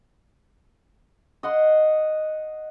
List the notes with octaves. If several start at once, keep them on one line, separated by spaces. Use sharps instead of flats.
D#5 F#5 C6